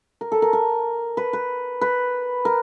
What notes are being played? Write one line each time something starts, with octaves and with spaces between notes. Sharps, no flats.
A#4
A4
A#4
A#4
B4
B4
B4
A#4